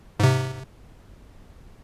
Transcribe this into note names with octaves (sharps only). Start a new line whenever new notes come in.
G#2 C3